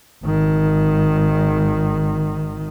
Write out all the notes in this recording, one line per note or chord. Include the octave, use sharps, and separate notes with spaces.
G#1 D#3